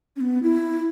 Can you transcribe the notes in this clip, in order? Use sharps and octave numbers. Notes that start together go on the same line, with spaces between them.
C#4
B3
E4